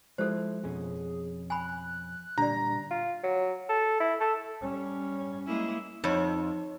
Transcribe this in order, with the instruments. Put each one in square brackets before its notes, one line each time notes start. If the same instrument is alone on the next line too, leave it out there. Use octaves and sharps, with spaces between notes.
[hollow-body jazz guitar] F3 E4 [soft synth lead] G#3 [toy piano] A4 C5
[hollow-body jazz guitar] F2 B2 C#4 [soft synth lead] G#4
[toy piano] G#5 B5 [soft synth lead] F#6
[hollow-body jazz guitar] A#2 D3 G3 [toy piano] D4 D5 [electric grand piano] A#5
[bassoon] F4
F#3
A4
E4
A4
[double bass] G3 C#4
[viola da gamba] G#3 A#3 E4
[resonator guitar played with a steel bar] F2 [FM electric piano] D#4 C#5